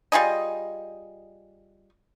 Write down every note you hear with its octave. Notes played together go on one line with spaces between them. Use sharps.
G3 F4 G#4 D#5